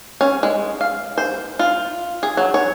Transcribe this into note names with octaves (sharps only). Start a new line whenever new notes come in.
C#4
G#3
F5
C5
F4
G#4
F#3
C#5